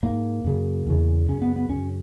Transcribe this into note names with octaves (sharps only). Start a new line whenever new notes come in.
G#2 A#3
F#2 C#3
E2 C#3
F#2 C#3 C#4
B3
B3
F#2 C#3 C#4